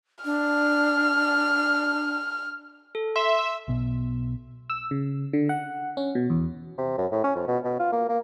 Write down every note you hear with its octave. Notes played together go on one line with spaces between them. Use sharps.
D4 F6
A4
E5 C6
E6
B1 B2
E6
C#3
D3
F#5
C#4
B2
E2
C3
F#2
A2
C#4
F2
B2
B2
F4
A#3
A#3